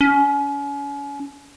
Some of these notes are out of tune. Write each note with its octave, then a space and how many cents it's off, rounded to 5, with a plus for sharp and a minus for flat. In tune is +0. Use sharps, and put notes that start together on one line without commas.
C#4 +35